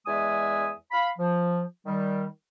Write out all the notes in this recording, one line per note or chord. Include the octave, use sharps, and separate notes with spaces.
E2 G#3 D5 E5 G#5 D#6
F5 B5
F3
D#3 G3